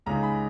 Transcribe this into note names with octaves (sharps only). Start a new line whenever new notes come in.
C#2 C#3 G#3 D#4 A#5
B5